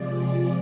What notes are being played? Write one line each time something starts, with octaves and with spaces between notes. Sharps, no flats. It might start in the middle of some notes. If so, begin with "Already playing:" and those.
Already playing: C3 F3 G#3 D5